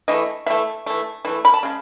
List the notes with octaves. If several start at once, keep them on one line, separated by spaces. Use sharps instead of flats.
E3 A3 D#5
E3 A3 E5
E3 A3
E3 A3
B5
A5
C#3 G#3